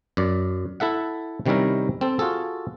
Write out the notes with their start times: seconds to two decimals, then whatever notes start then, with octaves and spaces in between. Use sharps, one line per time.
0.17 F#2 D5
0.80 E4 A4 E5 F#5
1.46 C3 D#3 G3 C#4 E4 A#4
2.01 C4 A4
2.19 F4 F#4 G#4 A4